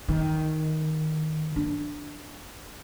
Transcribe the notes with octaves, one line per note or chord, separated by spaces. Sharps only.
D#3
D4